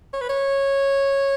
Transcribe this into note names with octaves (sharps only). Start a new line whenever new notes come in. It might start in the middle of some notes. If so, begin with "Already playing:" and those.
C#5
B4
C#5